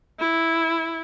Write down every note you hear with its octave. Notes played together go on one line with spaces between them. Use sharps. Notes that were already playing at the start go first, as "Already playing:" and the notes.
E4